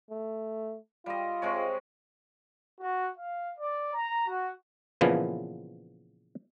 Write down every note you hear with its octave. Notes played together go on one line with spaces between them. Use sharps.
A3
G3 F4 D#5
C3 G#3 C#5
F#4
F5
D5
A#5
F#4
A#2 C#3 E3 F3 B3